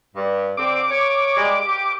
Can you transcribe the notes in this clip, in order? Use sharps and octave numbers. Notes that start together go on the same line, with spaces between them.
G2
D3 C4 D6
C#5
G3 G#3
G4